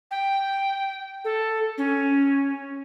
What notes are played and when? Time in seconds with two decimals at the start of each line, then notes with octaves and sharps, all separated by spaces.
0.11 G5
1.24 A4
1.78 C#4